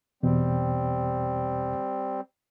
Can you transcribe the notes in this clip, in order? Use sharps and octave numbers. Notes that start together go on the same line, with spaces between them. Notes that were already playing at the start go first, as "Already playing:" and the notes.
E2 B2 G3 C4